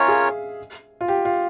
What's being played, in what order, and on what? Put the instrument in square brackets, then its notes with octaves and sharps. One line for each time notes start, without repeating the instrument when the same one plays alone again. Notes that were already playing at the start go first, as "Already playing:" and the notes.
Already playing: [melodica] C#4 F4 A#4 C#5 [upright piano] E5 F5
[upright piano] G#4
F4
G4
F4